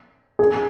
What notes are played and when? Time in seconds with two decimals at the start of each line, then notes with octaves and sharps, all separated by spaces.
0.39 G#4